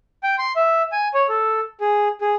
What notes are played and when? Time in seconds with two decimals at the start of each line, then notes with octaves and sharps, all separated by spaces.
0.23 G5
0.38 C6
0.56 E5
0.92 G#5
1.14 C#5
1.29 A4
1.81 G#4
2.21 G#4